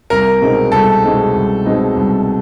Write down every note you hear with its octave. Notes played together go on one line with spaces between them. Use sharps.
C2 A#4
B2 G#3 C4 D#4
C2 A4
B2 G#3 C4 D#4
C2
B2 G#3 C4 D#4
C2